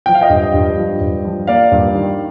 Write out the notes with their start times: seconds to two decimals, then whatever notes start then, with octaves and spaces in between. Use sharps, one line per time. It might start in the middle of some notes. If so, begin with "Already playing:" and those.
0.06 F3 G5
0.15 F5
0.21 D#5 G5
0.30 G2
0.54 G2
0.78 F3
1.01 G2
1.25 F3
1.47 A#3 D5 F5
1.72 G2
1.95 D#3